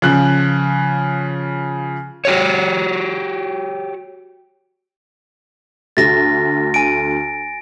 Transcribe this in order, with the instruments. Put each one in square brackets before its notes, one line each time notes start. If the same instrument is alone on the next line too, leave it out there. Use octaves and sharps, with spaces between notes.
[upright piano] C#3 F3 F#6
[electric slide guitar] F#4 G4 C#5
[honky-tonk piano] D2 A3 [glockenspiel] A6 A#6
[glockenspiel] G#5 D7